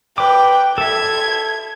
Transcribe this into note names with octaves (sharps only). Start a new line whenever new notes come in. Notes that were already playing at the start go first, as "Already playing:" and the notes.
B4 G5 D6
A4 E5 G#6